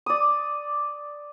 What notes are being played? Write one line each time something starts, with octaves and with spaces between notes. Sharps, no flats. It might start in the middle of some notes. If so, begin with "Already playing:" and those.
D5 D#6